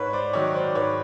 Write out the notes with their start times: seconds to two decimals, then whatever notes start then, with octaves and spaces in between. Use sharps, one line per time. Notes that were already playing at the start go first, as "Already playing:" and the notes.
Already playing: G#2 B4 C#5
0.13 C5 D5
0.33 D#3 F#3 C#5 D#5
0.54 C5 D5
0.75 G#2 B4 C#5